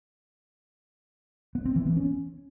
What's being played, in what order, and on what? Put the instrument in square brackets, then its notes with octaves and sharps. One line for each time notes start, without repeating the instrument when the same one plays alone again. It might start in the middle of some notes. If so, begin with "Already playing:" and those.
[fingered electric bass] B3
C4
E3
B3
C#4